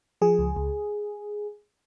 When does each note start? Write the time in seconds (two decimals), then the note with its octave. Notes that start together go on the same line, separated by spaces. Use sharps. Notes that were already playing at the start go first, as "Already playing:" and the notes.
0.22 F3 G#4
0.39 C#2
0.56 C#2